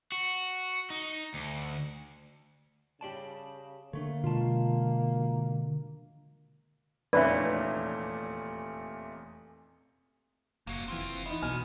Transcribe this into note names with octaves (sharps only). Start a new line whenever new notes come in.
F#4
D#4
D2
C#3 G4 D5 A5
D3 A3 A#3 D4 C#5
B2 D3 G#3 F4 A5
F1 E2 A#2 A3 C#4 B4 D5 E5
F#1 A#3 F#4
F1 E3 C4 F4
D#4 E4 F#5 B5
B1 B2 G#5 F6